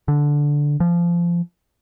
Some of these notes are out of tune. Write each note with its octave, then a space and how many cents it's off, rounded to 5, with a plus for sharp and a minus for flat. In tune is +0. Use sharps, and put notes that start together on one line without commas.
D3 -10
F3 -20